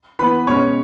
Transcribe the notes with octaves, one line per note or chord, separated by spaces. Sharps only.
E3 B3 B4 B5
B2 G#3 C#4 C#5 C#6